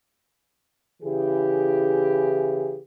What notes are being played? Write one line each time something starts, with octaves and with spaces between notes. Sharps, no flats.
C#3 E3 E4 G4 G#4